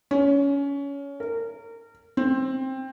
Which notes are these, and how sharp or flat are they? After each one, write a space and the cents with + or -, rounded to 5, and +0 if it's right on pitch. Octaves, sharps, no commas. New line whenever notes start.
C#4 +20
A#4 -25
C4 +15